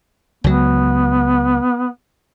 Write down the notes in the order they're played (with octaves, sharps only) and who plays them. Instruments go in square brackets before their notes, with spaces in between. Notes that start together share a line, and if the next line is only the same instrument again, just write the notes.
[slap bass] C#2 F#3 [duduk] B3